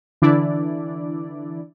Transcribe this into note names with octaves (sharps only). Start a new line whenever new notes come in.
D3 E3 D4 E4 D5